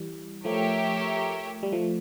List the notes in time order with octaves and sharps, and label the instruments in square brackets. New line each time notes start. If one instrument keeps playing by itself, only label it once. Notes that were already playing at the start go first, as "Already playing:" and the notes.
Already playing: [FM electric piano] E3 G3
[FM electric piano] F3 A3 [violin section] G4 A#4 C#5 E5
[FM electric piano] G3
F3 A3